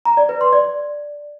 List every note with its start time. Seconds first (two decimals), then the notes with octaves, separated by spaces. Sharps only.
0.05 A#5
0.17 D5
0.29 B4
0.41 C6
0.53 D5